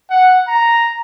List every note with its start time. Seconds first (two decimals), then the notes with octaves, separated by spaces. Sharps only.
0.10 F#5
0.48 A#5